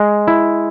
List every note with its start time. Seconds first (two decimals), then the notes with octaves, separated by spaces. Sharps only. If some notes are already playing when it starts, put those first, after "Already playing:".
Already playing: G#3
0.28 E4